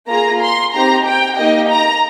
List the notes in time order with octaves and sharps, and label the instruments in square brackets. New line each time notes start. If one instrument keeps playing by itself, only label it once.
[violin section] A#3 F4 G#4 A#5
C6
C4 D#4 G4 A#5
G5
A#3 D#4 G4 D#5
A#5